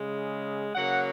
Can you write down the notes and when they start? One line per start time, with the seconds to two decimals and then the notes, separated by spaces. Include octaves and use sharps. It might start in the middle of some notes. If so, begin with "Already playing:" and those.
Already playing: C#3 G#3
0.74 C#3 F#3 A#3 F#5